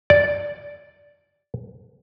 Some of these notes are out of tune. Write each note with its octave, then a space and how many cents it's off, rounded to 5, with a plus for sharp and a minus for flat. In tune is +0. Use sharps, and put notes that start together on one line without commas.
D5 -10